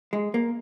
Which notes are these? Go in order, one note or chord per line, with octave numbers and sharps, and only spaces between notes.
G#3
A#3